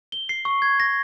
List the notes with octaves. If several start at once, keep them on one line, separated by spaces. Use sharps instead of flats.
G7
C7
C#6
G#6
A#6